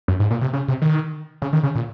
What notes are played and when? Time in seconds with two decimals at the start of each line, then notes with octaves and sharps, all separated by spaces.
0.08 F#2
0.20 G#2
0.31 A#2
0.41 C3
0.53 C#3
0.68 C3
0.82 D#3
1.42 C#3
1.53 D#3
1.63 C#3
1.75 A#2